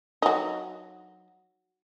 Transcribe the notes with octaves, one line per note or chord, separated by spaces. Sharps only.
F#3 D#4